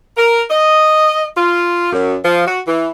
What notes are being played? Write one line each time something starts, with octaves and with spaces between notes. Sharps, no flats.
A#4
D#5
F4
F#2
F3
F#4
E3